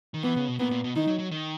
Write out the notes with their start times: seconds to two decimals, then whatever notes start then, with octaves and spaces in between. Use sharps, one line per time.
0.14 D#3
0.23 E3 B3
0.36 C#3
0.48 B2
0.59 A#2 B3
0.71 A#2
0.84 B2
0.96 D#3 D#4
1.07 F#3
1.19 F#3
1.31 D#3